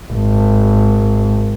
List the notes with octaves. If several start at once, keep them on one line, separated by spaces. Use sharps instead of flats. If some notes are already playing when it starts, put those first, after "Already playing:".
G#1